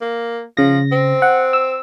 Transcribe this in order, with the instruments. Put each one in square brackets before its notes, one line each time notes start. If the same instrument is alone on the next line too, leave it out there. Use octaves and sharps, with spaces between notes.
[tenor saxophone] A#3
[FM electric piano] C#3 A#6 [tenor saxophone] F3
[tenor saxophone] C4
[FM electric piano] F#5
E6